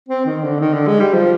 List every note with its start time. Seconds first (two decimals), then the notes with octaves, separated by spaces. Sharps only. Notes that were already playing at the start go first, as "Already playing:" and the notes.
0.09 C4
0.26 D#3
0.44 D3
0.61 D#3
0.74 D3
0.88 G#3
1.00 G3
1.14 F3